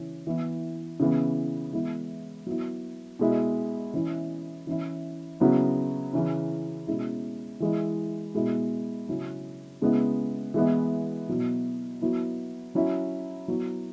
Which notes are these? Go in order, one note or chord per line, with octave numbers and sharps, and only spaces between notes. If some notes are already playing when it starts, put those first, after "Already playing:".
Already playing: C#3 E3 C#4
E3 B3 E4
C#3 E3 B3
E3 G#3 B3 E4
F#3 B3 E4
B2 G#3 E4
E3 C#4 E4
E3 C#4 E4
C#3 F#3 B3 E4
C#3 E3 C#4
B2 G#3 C#4 E4
E3 G#3 E4
B2 G#3 E4
C#3 F#3 C#4 E4
C#3 G#3 B3 E4
E3 G#3 B3 E4
B2 F#3 E4
F#3 B3 E4
F#3 C#4 E4
F#3 B3 E4